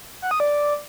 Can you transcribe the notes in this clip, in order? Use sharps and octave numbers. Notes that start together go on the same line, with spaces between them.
F#5
D#6
D5